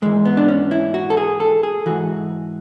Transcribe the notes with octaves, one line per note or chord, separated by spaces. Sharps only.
G#2 E3 G#3
B3
D4
C#4
E4
F#4
A4
G#4
A4
G#4
G#2 E3 F#4